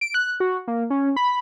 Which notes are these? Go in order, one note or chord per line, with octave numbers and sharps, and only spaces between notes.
D7
F#6
F#4
A#3
C#4
B5